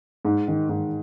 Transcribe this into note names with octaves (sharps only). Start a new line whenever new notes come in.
G#2
D#3
G#2